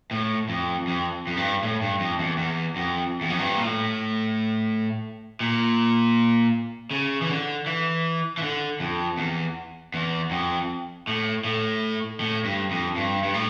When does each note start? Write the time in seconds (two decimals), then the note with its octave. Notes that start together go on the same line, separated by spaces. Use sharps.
0.11 A2
0.49 F2
0.87 F2
1.27 F2
1.37 G2
1.63 A2
1.82 G2
2.00 F2
2.19 E2
2.38 E2
2.76 F2
3.21 E2
3.30 F2
3.39 G2
3.54 A#2
3.64 A2
5.40 A#2
6.91 C#3
7.22 E3
7.30 D3
7.66 E3
8.38 E3
8.42 D3
8.80 F2
9.18 E2
9.94 E2
10.31 F2
11.07 A2
11.45 A2
12.20 A2
12.45 G2
12.71 F2
12.96 G2
13.23 G2
13.34 A2